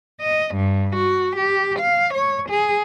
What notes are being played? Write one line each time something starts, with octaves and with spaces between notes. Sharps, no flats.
D#5
G2
F#4
G4
F5
C#5
G#4